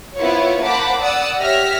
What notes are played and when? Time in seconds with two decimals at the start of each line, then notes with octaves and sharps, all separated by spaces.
0.15 B3 E4 F4 C5 C#5
0.63 A#3 C5 F#5 A5 B5 D6
1.00 D5 F#5 D#6 E6
1.41 G4 C#5 E5 F6 A#6 B6